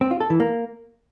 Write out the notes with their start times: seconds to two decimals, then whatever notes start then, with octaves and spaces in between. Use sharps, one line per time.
0.01 C4
0.11 F4
0.20 A4
0.30 E3
0.40 A#3